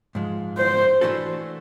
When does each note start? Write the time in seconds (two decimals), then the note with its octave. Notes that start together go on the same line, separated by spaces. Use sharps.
0.15 G#2 F3 G#3
0.58 C5
1.01 E3 A3 D4 F#4 A4